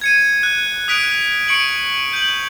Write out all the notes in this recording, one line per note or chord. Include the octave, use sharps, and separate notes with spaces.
G#6 C#7 D#7
F#6
D#6 F#6 B6 D7 F7
C#6 C#7 D7 F#7
G6 F#7